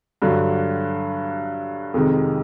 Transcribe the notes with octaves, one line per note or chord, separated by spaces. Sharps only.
G2 D3 F#3
F2 C3 D#3 G#3